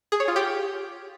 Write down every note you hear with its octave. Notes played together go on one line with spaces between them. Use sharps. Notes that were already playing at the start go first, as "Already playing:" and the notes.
G#4
C#5
F4
G4